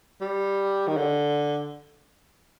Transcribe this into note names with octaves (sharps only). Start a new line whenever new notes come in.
G3
D#3
D3